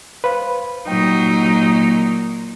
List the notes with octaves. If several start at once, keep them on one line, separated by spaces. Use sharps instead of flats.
B4 C5 F5
A#2 F#3 D#4 G5